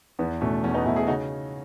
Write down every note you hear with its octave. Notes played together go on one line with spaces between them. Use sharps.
E2 B3
B2 A3 C#4
E2 C#4
B3 D#4
B2 A3 C#4 E4
E4 G#4
C#3 D#4 F#4